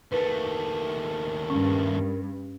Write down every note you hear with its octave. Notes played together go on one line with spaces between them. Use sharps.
D#2 A3 A#4 B4
G2 C#4